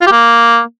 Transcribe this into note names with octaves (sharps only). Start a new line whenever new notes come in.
F4
G4
A#3